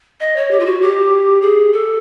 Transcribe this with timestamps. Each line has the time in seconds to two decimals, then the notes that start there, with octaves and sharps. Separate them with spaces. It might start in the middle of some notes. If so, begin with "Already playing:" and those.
0.20 D#5
0.36 C#5
0.51 G4
0.60 F4
0.66 F#4
0.81 G4
1.42 G#4
1.72 A4